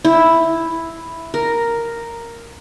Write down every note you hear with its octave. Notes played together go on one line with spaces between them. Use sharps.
E4
A#4